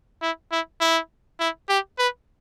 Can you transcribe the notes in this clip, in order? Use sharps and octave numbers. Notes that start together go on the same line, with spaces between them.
E4
E4
E4
E4
G4
B4